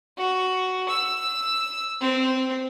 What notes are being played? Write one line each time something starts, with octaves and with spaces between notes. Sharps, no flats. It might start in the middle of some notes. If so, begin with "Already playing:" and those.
F#4
E6
C4